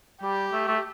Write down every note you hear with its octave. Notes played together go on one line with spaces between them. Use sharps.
G3 G4
A3
A3